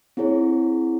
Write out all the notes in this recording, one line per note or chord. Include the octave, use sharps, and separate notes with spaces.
C4 E4 G#4 C#5